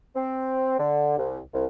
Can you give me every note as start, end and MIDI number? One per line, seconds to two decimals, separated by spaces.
0.15 0.76 60
0.79 1.16 50
1.17 1.39 36
1.54 1.65 36